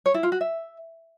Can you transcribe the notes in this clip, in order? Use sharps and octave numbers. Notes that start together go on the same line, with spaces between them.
C#5
E4
F4
F#4
E5